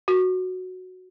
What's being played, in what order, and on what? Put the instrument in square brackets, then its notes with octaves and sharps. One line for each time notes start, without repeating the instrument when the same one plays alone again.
[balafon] F#4